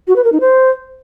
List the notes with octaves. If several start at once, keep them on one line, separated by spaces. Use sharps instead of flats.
F#4
B4
A#4
D#4
C5